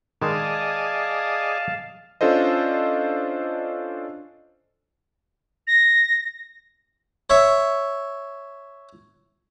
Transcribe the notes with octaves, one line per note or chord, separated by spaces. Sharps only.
D#3 G#3 D#4 G#4 D5 D#5 F5 A5
C#4 D4 F4 A4 C5 D#5
A#6
C#5 E5